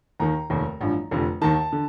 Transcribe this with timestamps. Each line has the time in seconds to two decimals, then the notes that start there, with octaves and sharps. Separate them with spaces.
0.20 D#2 D#3 A#5
0.50 F1 D#2 D#3
0.81 A1 G2 F3
1.11 F1 F2 D3
1.41 D#2 D#3 A5
1.72 D3